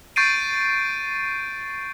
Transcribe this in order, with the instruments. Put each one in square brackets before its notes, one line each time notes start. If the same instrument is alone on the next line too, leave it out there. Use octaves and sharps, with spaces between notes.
[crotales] C#6 G6 A6 C7 D7 D#7